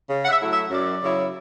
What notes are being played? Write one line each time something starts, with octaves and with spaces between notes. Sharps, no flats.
C#3
F#5
E5
F#3 A3 E4
E5
F#2 D5
C#3 F#3 C#4 E4